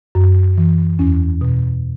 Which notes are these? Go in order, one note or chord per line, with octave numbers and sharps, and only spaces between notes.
F#2
E3
E2 C#4
B2